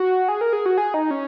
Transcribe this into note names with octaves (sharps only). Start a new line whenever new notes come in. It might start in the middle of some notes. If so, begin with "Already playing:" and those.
Already playing: F#4
G#4
A#4
G#4
F#4
G#4
D#4
C#4